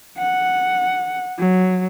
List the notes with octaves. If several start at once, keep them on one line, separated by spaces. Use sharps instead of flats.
F#5
F#3